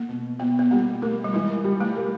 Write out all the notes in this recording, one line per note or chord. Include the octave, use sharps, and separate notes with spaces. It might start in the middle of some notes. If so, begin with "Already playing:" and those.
Already playing: A#3
B2
B2 B3
B3
G3 A#3
A3 A#3
G3
E3 G#3
G3
A3
A#3